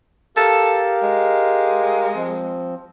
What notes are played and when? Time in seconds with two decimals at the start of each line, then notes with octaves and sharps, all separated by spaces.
0.37 G4 A4 A#4 F5
1.03 G#3
2.15 F3 C4